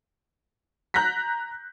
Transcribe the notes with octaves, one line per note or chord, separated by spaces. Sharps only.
A#5 F#6 G6 A#6 B6